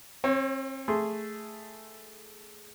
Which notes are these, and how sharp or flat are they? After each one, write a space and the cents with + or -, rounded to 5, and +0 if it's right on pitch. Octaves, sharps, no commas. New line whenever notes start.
C4 +35 C#5 -20
A3 +0 G#4 +0 C6 +0